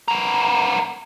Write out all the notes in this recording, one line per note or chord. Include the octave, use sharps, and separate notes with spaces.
B3 A#4